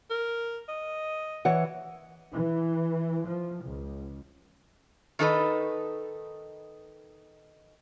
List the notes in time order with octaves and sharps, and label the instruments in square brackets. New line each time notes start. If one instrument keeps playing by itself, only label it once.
[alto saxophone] A#4
D#5
[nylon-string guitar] E3 C#5 F#5
[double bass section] E3
F3
C#2
[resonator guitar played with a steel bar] D#3 D#4 A4 B4